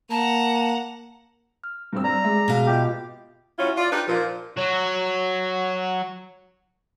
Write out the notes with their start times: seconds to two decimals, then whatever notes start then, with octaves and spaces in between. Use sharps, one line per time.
0.11 A#3 F#5 A5 A#5
1.64 F6
1.93 G2 C4 E6
2.04 D5 A#5
2.24 G#3 G#4 E5
2.48 B2 F5
2.66 B3 F4 G4 D#5
3.58 F#3 C#4 E4 F4
3.77 F4 D5
3.92 D4 D#4 G4 B4
4.08 A#2 F3
4.57 F#3 F#4